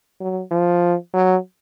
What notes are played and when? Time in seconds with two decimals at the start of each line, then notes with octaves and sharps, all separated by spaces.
0.21 F#3
0.51 F3
1.14 F#3